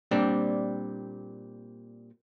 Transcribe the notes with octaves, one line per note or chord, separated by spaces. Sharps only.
A#2 G3 C4 D4